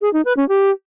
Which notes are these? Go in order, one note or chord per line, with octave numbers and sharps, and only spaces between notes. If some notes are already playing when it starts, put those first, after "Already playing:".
G#4
D#4
B4
C#4
G4